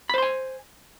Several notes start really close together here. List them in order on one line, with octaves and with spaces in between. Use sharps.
B5 C5 C6 G#5